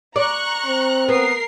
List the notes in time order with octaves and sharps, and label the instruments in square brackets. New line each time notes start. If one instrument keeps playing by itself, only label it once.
[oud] D5 [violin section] A#5 C#6 F#6
[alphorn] C4
[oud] B3 [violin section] A#4 C7